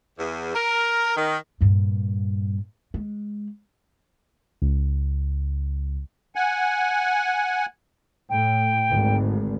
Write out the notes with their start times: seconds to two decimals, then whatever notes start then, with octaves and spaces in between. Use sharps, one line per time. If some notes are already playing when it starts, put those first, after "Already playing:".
0.18 E2
0.54 A#4
1.17 D#3
1.61 G2 A#2
2.94 G#3
4.62 C#2
6.35 F#5 G#5
8.29 A2 G5
8.90 G#1 D2